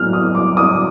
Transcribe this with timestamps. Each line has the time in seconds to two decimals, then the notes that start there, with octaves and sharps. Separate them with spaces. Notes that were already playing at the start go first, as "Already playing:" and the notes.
Already playing: A2 F#3 B3 F6
0.13 D#6
0.35 D6
0.57 D#6